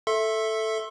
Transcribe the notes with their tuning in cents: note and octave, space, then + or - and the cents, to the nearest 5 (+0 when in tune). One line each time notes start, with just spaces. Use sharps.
A4 +0 E5 +0 C6 +35